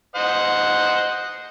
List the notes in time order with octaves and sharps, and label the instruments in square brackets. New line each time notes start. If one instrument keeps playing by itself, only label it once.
[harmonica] C5 D#5 F#5